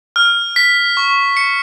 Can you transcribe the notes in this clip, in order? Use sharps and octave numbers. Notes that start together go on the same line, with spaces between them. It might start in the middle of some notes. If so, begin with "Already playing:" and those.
F6
B6
C#6
C#7